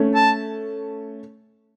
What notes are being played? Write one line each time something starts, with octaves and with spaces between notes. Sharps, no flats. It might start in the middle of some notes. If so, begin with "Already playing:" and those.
Already playing: A3 C#4
A5